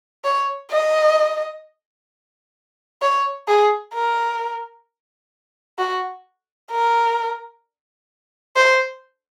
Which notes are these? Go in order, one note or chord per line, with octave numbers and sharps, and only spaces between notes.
C#5
D#5
C#5
G#4
A#4
F#4
A#4
C5